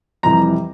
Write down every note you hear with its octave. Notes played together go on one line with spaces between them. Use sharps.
F2 C3 E3 G3 A#5